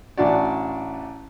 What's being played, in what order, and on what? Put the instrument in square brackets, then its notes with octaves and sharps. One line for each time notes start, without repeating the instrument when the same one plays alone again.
[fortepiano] A1 D4 F#4 D5